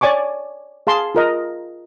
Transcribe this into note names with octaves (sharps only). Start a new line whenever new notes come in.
C#5 D5 G#5 C#6 D6
G#4 F5 A5 C6
F4 A#4 D#5